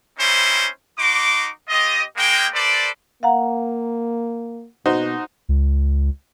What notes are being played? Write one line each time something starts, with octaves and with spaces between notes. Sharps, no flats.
G3 C4 C#4 D#4 E4 C5
D#4 F#4 C6 D6
C4 F4 G4 D#5
G#3 A#3 G5
A4 B4 C5 D5
A#3 F5 F#5 A#5
B2 D#4 F#4 C5
C#2